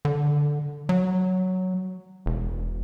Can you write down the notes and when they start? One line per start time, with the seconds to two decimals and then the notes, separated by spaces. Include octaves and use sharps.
0.05 D3
0.89 F#3
2.26 E1